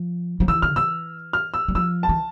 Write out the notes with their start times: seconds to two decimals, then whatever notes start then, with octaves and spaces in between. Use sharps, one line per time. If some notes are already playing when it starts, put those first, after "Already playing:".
Already playing: F3
0.40 F3
0.48 E3 E6
0.62 D3 F6
0.76 E3 E6
1.33 F6
1.54 E6
1.68 G3
1.75 F3 E6
2.03 A5
2.09 E3